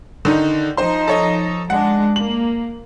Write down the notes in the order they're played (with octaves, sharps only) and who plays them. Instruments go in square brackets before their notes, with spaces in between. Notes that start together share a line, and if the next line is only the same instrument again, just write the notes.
[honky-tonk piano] D3 D#3 D#4
[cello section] F3 D#4 [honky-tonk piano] C5 C6
[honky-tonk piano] A4 C#5 D#5
[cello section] G#3 D4 [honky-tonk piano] F#5
[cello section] A#3 [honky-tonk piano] F#7